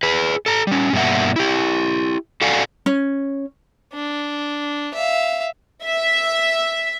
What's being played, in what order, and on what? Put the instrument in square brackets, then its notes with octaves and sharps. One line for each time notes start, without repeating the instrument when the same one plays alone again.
[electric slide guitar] G#4 B4
A4 A#5
G3 C#4
G2 B2 A#3 E5 F#5
E4 G4
F#4 A4 D5 F5 F#5 G#5
[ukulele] C#4
[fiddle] D4
E5 F5
[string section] E5